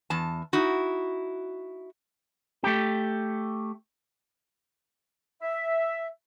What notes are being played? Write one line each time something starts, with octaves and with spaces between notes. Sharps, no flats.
E2 A5
D#4 E4 F#4
A3 G4
E5